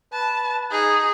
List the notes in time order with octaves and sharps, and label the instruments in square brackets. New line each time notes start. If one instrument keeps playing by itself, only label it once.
[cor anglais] B4 [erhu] A5
[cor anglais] D#4 [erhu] G#4